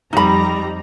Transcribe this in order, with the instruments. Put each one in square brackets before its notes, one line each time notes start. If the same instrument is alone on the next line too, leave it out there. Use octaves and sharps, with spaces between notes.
[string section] F2 G3 A#5 [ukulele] D#4 B5